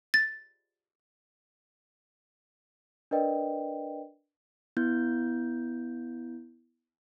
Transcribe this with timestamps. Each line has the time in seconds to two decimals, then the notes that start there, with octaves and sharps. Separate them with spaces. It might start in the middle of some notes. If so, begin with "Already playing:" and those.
0.14 A6
3.11 D4 A#4 B4 D5 D#5 G5
4.77 B3 E4 G6